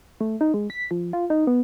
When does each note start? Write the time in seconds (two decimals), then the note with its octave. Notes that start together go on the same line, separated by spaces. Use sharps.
0.21 A3
0.41 D#4
0.54 G#3
0.70 B6
0.91 F3
1.13 F4
1.30 D#4
1.47 B3